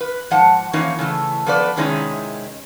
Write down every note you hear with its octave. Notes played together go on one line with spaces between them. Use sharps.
B4
G#2 F3 F#5 A5
E3 F3 A#3 C#4 D#4
C#3 E3 A3
F3 B3 A4 B4 D5
C3 D#3 G#3 C#4 D#4 E4